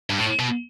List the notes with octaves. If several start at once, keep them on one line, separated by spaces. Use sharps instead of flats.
G2
A2
B2